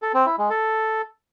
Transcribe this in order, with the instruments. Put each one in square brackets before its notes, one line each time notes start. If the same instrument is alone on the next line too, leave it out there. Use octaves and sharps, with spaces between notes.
[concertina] A4
C4
E4
G#3
A4